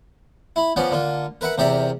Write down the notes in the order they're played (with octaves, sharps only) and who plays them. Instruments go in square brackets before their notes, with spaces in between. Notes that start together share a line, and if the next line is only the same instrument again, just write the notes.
[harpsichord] E4 B5
F3 B3 C#4 D5
D3 A#3 F4
A#4 B4 E5 F#5
E2 C3 G4 A#4 D5 E5